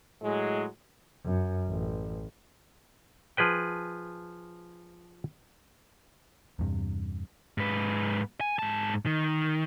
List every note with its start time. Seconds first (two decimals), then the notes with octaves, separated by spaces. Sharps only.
0.22 A2 F#3 G#3
1.25 F#2
1.69 A1
3.37 F3 G#4 B4 G5
6.59 E2 G2 C3
7.58 G#2 B4
8.41 G#5
8.59 G#2 A5
9.06 D#3